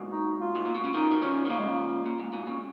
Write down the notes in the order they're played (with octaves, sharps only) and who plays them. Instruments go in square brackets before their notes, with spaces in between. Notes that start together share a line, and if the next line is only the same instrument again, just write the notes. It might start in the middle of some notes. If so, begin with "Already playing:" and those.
Already playing: [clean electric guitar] G#2 B2
[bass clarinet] D#4
F4
[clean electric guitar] G#2
A#2
B2
C#3
[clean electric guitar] B2 D#3 [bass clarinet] D#4
[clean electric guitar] D#3
[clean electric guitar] C#3 F3 [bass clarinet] C#4
[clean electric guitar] D#3
[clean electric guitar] C#3 F3 [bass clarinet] A#3
[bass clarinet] G#3
A#3
[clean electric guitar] A#2
G#2
G#2 B2
A#2 C#3